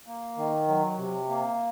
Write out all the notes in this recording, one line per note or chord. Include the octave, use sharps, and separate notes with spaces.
A#3
D#3
F#3
C3
A#3